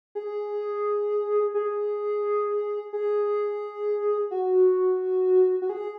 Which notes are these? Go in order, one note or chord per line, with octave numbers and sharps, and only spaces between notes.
G#4
G#4
G#4
F#4
F#4
G#4